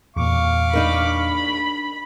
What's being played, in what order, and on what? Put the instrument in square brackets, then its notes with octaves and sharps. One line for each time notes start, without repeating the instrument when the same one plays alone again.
[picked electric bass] E2 A#2 [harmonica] F5 C#6 D6
[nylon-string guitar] D4 D#4 A#4 [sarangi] B5